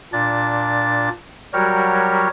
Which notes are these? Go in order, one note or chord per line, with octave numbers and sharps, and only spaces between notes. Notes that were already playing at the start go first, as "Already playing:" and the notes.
A#2 D4 A6
F#3 G3 F#4 G4 A#4 C#5